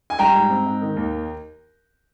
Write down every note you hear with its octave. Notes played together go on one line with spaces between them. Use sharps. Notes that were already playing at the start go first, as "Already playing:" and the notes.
G#5
G3 G5 A#5
G#2
C4
G#2
D#3
D#2